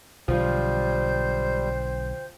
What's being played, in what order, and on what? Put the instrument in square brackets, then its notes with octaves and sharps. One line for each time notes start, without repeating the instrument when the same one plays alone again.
[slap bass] B1 D3 [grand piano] F3 F4 [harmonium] G3 [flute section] C5 G5 G6